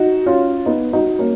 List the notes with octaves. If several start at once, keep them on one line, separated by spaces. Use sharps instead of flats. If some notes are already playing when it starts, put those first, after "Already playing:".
Already playing: D#4 F#4
C#4 F4
B3 D#4
D#4 F#4
A#3 C#4